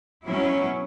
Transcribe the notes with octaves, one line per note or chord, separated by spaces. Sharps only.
B2 F#3 C#4 E4